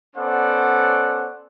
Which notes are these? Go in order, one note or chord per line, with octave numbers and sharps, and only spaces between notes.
B3 C#4 A4 C5 D5 F#5